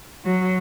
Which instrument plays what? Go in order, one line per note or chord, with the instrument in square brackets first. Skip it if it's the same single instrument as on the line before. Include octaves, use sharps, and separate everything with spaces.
[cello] F#3